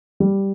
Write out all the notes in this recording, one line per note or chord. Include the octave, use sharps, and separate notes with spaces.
G3